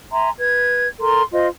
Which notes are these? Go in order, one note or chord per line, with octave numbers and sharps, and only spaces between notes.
E5 G#5 A#5 C6
B4 G#6
A4 A#4 A#5 C6
F4 C5 D#5